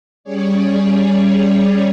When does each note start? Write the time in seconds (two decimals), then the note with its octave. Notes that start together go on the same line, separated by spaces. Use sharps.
0.24 G3 C#4 G#4 C#5 D5